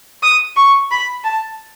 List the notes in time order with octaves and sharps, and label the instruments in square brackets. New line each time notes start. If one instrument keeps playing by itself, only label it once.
[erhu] D#6
C#6
B5
A5